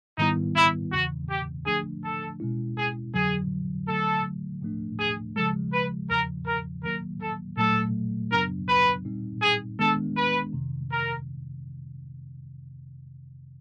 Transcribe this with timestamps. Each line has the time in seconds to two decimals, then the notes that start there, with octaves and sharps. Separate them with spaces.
0.18 G#2 D#3 G3 B3 D#4 E4
0.55 E4
0.92 E2 C#3 E3 F#4
1.29 G4
1.66 D3 F3 A3 D4 G#4
2.03 A4
2.40 B2 G#3 C#4 E4
2.77 G#4
3.14 F2 D3 F#3 G#4
3.88 D3 F#3 A3 A4
4.61 A2 F3 A3 D4
4.99 G#4
5.36 C#3 F3 G#3 A4
5.72 B4
6.09 E2 C#3 F3 A#4
6.46 A#4
6.83 D#3 F#3 A#3 A#4
7.20 A4
7.57 A#2 F#3 A3 A4
8.31 F#2 C#3 F#3 B3 D4 A#4
8.69 B4
9.05 A#2 G3 C4 D#4
9.42 G#4
9.79 D#3 G#3 B3 D4 A4
10.16 B4
10.53 F2 C3 D#3
10.90 A#4